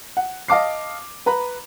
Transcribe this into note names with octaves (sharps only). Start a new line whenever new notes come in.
F#5
D#5 F5 A5 D6 C7
B4 A#5 B5